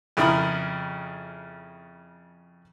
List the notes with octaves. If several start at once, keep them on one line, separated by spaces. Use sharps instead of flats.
F2 C#3 E4 A#4 B5 D#6